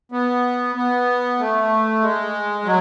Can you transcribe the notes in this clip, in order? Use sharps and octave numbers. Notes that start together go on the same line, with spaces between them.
B3
B3
A3
G#3
F#3